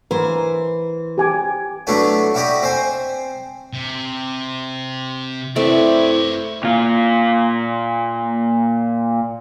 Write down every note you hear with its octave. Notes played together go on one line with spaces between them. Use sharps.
E3 A#4 C5
G4 G#5 D6
F#3 A3 B3 D4 E4 F#4
E4 F#4 G4 D5 D#5
C4 C5 G#5
C3
A3 C4 E4 B4 D5 E5
A#2 F4